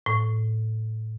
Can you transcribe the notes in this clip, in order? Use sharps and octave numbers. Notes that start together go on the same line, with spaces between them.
A2